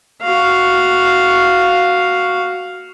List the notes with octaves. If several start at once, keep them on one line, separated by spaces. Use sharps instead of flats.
F#4 F5